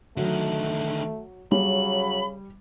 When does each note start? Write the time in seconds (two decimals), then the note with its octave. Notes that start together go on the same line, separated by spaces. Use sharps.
0.17 D3 D#3 F#3 A3
1.52 C#3 F#3 G3 B5